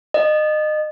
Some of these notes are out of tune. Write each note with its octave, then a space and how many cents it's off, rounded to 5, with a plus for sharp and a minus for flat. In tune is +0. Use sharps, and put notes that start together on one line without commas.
D#5 -25